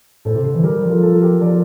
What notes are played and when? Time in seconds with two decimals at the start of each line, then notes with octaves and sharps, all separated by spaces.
0.25 A2 A4 C5
0.35 C3
0.44 D3
0.54 E3
0.64 G3 G4 A#4
0.83 F3
0.89 F4 A4
1.03 F4 A4
1.21 G4 A#4
1.41 F3 A#4 D5